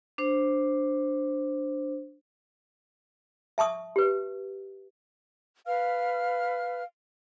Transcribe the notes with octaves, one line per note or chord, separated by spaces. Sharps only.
D4 C5
E5 A5 C#6 D#6
G4 B4
B4 F5 F6